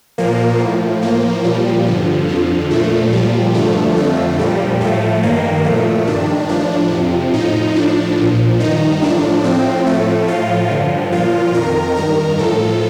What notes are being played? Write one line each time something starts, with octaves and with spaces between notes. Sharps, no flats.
A#2 F3 A#3
A2 F3
A2 F3 A#3
A#2 F3 G3
G2 D3 F3
F2 D3 F3
A#2 F3 A3
A#2 F3 G3
G2 D3 F3 A3
F2 D3 F3 A3
A#2 F3 G3
A2 F3 A3
G2 D#3 A#3
A#2 F3 A3
G2 D#3 D4
A2 F3 D4
F2 C3 F3
A2 F3 D#4
A2 F3 D4
A#2 F3
G2 D#3 D#4
A2 F3 D4
A2 F3 C4
A2 F3 A3
A2 F3 F4
G2 D3 F3
A#2 F3 F4
F2 D#3 A#4
G2 D#3 A#4
A2 F3 A4